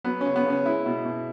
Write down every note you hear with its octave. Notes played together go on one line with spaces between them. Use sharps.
F#3 B3
C#4
C#3
B3
C#3 C#4
G#3 E4
B2
B2